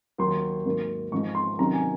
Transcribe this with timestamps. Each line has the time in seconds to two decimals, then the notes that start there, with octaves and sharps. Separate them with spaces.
0.18 D#2 D#3 F#3 C6
0.65 G#2 F#3 A#3
1.12 G#2 F3 G#3 C#6
1.35 C6
1.59 C3 D#3 F#3 C#4 A#5
1.74 G#5